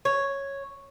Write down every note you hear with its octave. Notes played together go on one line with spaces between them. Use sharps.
C#5